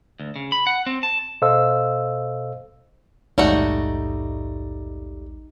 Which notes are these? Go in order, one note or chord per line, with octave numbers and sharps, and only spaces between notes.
D2
C#3
B5
F#5
C4
A5
B2 A4 C5 D#5 F5 E6
A#1 D#2 G#2 G3 A3 D#4 F#4